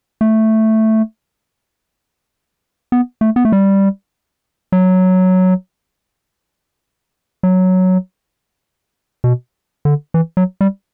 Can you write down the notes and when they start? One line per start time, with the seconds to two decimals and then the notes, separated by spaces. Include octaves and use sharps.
0.21 A3
2.92 B3
3.21 A3
3.36 B3
3.45 A3
3.52 G3
4.72 F#3
7.43 F#3
9.24 B2
9.85 D3
10.14 E3
10.37 F#3
10.61 G3